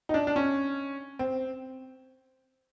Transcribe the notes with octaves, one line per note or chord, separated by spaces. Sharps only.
D#4
D4
D4
C#4
C4